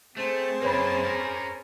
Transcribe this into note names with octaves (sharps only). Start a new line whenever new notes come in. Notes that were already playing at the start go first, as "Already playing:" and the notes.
A3 C4 G#4 C5 A5
F#2 A#3 B4 C#5 B5
C#4 A#4